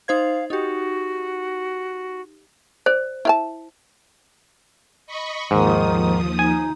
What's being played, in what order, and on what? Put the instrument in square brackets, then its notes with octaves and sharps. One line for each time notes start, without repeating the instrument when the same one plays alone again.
[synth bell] D#4 C5 G#6 [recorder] F5
[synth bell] D#4 G4 [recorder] F#4
[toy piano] C5 [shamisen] D5
[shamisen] E4 F5 A5
[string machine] D#5 B5 C#6
[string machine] D#2 F3 D#6 [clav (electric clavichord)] G#2 [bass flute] D#3
[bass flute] D#4 [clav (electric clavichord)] G#5